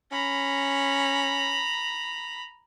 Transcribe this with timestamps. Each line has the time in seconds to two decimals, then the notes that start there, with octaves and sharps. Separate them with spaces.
0.12 C#4 A#5 B5